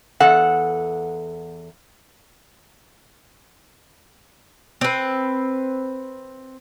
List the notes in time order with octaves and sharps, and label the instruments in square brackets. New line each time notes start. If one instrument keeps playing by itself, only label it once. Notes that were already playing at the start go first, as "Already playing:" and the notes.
[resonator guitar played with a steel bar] E2 A4 F#5
[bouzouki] C4 B4